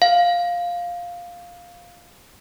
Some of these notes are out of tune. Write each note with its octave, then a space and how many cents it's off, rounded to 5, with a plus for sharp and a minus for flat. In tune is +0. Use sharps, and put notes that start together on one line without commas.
F5 +5